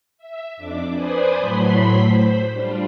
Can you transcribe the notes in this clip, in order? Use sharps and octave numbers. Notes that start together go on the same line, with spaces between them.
E5
F2 D4 D6
B4 C5 D5 G#5 D#6
A2 F#3 A3 B5 C6 B6
C5
G3 D4 F4